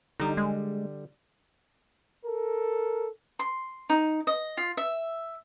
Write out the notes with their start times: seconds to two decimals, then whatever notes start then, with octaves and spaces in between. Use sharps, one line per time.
0.20 D3 G3 D#4
0.37 G#3
2.25 A4 A#4
3.39 C6
3.90 D#4
4.27 D#5
4.57 F4
4.77 E5